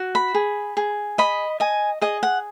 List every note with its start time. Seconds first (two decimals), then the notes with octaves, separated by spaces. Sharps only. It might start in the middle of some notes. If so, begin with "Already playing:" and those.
Already playing: F#4
0.15 B5
0.35 G#4
0.77 G#4
1.18 D#5 B5
1.60 D#5 G#5
2.02 G#4 D#5
2.23 F#5